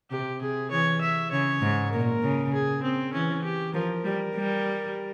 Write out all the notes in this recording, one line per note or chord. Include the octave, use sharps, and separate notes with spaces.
C3 G4
C3 G#4
E3 C#5
E5
C#3 C#5
G#2
A#2 A#4
C#3
G#4
C4
E3 C#4
G4
F3 A#4
G3
G3